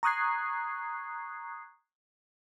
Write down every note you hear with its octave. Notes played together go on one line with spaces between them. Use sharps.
A#5 C#6 D#6 F#6 G#6 C7